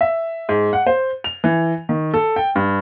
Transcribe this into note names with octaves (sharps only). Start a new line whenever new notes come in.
E5
G#2
F#5
C5
F7
E3
D#3
A4
G5
G2